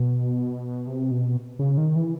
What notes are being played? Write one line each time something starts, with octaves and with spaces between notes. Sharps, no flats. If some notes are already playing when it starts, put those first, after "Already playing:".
Already playing: B2
C3
B2
C#3
D#3
E3